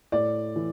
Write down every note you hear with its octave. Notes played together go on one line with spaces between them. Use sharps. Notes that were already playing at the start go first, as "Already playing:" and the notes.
A2 D5
E3